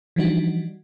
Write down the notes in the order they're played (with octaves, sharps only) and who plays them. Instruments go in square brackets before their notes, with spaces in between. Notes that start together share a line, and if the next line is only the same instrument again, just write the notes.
[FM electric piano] E3 F3 G3 D4 D#4 F#4